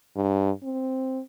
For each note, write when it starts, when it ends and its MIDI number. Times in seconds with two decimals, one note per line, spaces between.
0.16 0.51 43
0.63 1.20 60